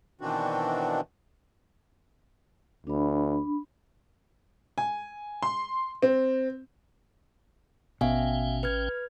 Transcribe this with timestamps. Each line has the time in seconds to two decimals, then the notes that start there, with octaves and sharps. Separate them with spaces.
0.21 B2 D#3 E3 C4 D4 F#4
2.87 D2 D4 B5
4.78 G#5
5.43 C6
6.03 C4
8.01 A1 B2 C#4 E5 F5 G5 G#5
8.63 B4 F6 G#6